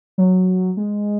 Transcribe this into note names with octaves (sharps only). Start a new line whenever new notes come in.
F#3
G#3